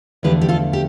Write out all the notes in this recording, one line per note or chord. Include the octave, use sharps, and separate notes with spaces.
E2 D3 F3 A3 G4 B4
G4
F4 A4
G4